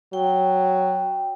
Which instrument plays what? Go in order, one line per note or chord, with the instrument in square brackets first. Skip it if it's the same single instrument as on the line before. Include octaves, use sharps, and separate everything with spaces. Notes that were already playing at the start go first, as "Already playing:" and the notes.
[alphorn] F#3 [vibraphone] G5